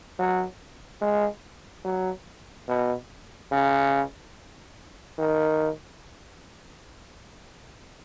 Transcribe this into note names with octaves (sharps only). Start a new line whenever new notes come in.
F#3
G#3
F#3
B2
C#3
D#3